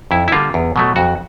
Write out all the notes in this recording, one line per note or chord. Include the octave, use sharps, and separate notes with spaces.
F2 E4
E4
D3 G3 A#3 F4
E2
B2 F#3 A3
F2 F#4